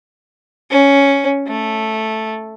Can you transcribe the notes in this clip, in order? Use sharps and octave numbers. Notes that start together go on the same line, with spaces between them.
C#4
A3